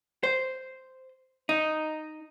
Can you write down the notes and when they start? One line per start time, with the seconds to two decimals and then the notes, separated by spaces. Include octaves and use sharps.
0.23 C5
1.49 D#4